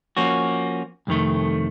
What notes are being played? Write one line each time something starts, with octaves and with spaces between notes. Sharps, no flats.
F3 A#3 C#4 F#4
C2 F2 D#3 A3